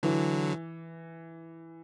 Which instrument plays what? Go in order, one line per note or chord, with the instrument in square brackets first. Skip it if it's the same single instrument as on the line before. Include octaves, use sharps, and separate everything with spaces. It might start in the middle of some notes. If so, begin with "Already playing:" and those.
[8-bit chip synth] D3 F#3 [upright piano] E3